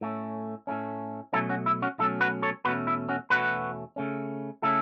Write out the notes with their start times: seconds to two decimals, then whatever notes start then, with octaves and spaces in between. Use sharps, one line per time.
0.01 A2 A3 C#4
0.67 A2 A3 C#4
1.33 B2 F#3 A3 C#4 E4 A4
1.49 C#4 F#4
1.66 E4
1.82 C#4 F#4
1.98 B2 F#3 A3 C#4 E4 A4
2.21 F#4 B4
2.42 A4 C#5
2.65 E2 B2 A3 C#4 F#4 B4
2.87 E4
3.09 C#4 F#4
3.30 E2 B2 A3 C#4 F#4 B4
3.96 C#3 A3 C#4
4.62 C#3 A3 C#4 E4 A4